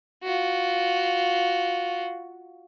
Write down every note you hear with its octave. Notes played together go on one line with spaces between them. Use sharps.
F4 F#4